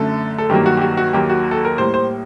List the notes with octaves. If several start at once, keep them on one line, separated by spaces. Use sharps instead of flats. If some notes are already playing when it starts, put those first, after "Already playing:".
Already playing: F#2 D3 A3 A4
A4
G2 D#3 F#3 A#3 G4
F#4
G4
F#4
F#4
D#2 D#3 F#3 A#3 G4
F#4
A4
A#4
A2 G3 A#3 C5
C5